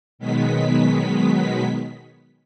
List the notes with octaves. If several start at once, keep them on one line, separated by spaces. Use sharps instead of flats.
B2 D#3 F#3 G#3 B3 B6